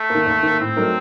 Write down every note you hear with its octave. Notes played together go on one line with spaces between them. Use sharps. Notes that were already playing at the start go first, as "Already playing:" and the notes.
Already playing: A3
D#3 A#3
D#2
D#3 A#3
A2 C4
F#3 A3 D#4 A#4